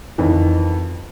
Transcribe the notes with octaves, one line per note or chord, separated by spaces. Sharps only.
F2 D#3 E3